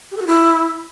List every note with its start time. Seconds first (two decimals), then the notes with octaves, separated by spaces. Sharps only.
0.11 G4
0.16 A4
0.21 F#4
0.27 E4